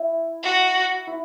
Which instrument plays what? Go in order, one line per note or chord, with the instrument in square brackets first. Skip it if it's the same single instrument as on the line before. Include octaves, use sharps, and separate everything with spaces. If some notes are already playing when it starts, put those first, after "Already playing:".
Already playing: [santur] E4
[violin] F#4
[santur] E4